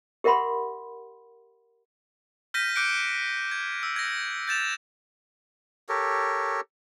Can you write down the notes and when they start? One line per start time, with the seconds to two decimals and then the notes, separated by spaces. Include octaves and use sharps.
0.24 G4 A#4 E5 F#5 B5 C6
2.54 F6 G6 A#6 B6 D#7
2.76 D6 F#6 G6 C#7 D7
3.52 G#6
3.83 E6
3.96 G#6 A#6
4.48 G6 A6 E7 F7
5.89 G4 A4 A#4 C#5